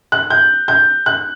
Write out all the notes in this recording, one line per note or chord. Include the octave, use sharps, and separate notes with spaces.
F#6
G6
G6
F#6